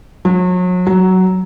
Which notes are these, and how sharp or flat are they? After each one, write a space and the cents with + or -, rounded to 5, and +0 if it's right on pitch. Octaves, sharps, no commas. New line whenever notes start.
F#3 -35
F#3 +10